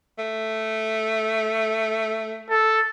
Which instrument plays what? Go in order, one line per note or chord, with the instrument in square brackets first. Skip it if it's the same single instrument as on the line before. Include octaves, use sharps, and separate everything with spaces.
[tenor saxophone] A3
[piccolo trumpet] A4